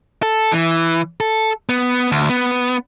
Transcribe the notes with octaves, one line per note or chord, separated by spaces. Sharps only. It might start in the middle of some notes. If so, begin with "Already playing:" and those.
A4
E3
A4
B3
D2
B3